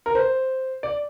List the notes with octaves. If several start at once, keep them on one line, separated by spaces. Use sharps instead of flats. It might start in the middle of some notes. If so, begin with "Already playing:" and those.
A#4
C5
D5